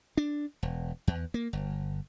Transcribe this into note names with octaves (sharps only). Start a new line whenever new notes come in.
D4
E1
E2
A#3
G1